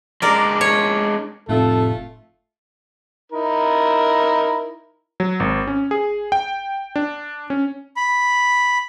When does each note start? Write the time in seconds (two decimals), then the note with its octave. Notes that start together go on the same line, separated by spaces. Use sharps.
0.22 G#3 D4 A#4 D5
0.61 C#5
1.49 F1 A2 A3 F4 A4
3.32 D#4 E4 A#4
5.20 F#3
5.40 G#1
5.67 C#4
5.91 G#4
6.32 G5
6.96 D4
7.50 C#4
7.96 B5